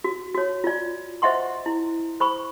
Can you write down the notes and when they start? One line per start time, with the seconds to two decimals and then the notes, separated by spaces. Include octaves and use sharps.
0.04 F#4
0.34 F#4 C#5
0.64 F4 D5
1.22 C5 D#5 E5 F#5 C6 C#6
1.66 E4
2.20 C5 B5 C#6